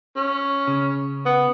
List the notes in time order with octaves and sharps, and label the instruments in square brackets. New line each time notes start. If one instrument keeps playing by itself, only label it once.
[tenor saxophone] C#4
[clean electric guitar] C#3
[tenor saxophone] B3